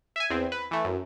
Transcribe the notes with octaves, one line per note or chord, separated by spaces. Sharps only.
E5 G#5
E2 C4
B4
E3 A3
F#2